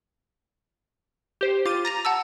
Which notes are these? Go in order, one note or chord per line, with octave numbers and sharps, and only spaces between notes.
G4 C5
F4 D6 A6 D#7
A#5 A6 A#6 F7
F#5 A5 E6